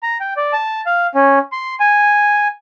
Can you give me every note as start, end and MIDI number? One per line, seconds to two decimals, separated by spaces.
0.03 0.18 82
0.20 0.33 79
0.37 0.53 74
0.53 0.81 81
0.86 1.07 77
1.15 1.39 61
1.52 1.75 84
1.80 2.48 80